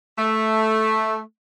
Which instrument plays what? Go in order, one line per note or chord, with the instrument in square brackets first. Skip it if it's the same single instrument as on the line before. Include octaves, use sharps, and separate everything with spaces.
[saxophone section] A3